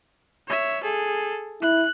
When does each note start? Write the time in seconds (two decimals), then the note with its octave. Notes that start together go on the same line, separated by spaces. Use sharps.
0.47 C#5 E5
0.83 G#4 A4
1.62 E4 F#6